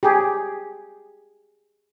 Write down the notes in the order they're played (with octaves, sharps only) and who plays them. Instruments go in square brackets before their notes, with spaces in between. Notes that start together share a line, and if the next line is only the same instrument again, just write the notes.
[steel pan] G4 G#4